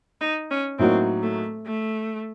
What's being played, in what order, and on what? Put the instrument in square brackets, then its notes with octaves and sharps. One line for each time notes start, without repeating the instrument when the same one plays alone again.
[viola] D#4
C#4
[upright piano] A2 F#3 A#3 D#4 F#4 [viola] C4
[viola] A3
A3